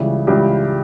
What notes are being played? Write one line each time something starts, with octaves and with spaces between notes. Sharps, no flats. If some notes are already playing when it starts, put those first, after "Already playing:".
Already playing: C#2 C#3 E3 G3
C#2 C#3 E3 G3 G4